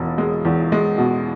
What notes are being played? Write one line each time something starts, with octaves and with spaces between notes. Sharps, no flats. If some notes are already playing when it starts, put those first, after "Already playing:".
Already playing: E1 B2
G#3
E2
G#3
B2